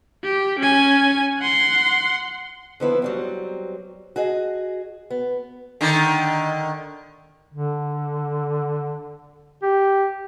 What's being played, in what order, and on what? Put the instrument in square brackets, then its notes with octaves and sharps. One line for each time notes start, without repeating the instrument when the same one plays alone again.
[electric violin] G4
C#4 G#5
F#5 C6
[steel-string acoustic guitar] D3 F3 B3 E4
F#3 G3 C4
F#4 G#4 D#5
B3
[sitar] D3 D#3
[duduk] D3
G4